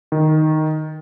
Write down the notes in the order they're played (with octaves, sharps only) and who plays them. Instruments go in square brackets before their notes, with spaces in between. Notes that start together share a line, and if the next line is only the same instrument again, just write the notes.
[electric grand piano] D#3